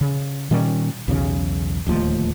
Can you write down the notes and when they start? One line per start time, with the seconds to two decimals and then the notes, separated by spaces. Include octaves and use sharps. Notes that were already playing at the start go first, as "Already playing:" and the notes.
0.01 C#3
0.51 A#2 D#3 G3 C#4
1.08 B1 E2 C#3
1.86 D1 D#2 F3 A3